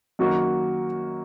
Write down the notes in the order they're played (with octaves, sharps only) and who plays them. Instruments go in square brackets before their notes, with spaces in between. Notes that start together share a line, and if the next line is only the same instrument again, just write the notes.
[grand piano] F#2 D#3 A#3 [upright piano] F#4